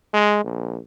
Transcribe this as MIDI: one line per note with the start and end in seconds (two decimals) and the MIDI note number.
0.14 0.40 56
0.44 0.78 34